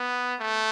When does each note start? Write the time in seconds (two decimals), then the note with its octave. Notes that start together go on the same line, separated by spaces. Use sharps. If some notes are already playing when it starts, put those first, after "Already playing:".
Already playing: B3
0.40 A3